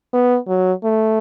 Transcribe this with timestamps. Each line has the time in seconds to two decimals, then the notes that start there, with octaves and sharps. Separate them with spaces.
0.13 B3
0.48 F#3
0.84 A3